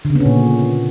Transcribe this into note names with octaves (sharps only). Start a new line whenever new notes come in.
D3
C#3
B3
C#4
A#2